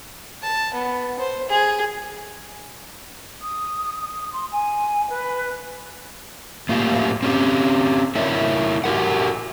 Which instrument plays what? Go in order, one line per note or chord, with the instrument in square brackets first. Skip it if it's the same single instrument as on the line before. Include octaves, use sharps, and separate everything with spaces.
[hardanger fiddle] A5
B3
C5
G#4
[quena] D#6
C6
G#5
B4
[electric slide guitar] A2 A#3 F4 G4
C4 C#4 G4
E4 A#4 C#5 D5 E5
F#4 G4 A#4 F#5